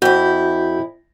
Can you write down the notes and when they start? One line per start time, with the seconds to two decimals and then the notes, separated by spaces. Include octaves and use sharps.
0.02 F2 E4 F#4 G6